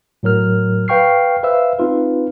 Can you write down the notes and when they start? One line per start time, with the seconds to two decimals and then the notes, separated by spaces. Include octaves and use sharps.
0.23 A2 F#3 A#4 F6
0.88 B4 F5 G5 C#6 F6 C7
1.43 B4 C5 E5 F5 E6
1.79 C4 D#4 F4 B4